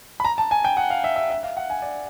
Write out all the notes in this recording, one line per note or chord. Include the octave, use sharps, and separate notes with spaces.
B5
A#5
A5
G#5
G5
F#5
F5
E5
E5
E5
F5
F#5
G#5
D5